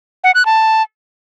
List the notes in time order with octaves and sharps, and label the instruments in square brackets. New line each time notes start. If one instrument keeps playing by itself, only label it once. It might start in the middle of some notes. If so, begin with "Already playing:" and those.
[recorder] F#5
F#6
A5